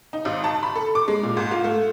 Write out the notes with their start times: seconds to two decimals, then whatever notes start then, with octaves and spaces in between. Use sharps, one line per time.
0.13 D#4
0.25 G#1
0.44 A5
0.63 B5
0.75 A4
0.95 D6
1.08 G#3
1.23 A#2
1.37 G#2
1.51 F4
1.64 A3